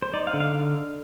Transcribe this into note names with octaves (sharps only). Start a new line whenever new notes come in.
C5
D#4 D5
F5
D3
F5